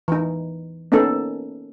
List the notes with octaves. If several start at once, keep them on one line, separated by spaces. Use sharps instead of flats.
E3 D#4
A#3 B3 C#4 D#4 A4